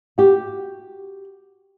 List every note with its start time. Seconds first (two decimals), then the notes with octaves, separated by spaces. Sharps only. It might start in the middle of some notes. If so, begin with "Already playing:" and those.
0.18 F#4 G4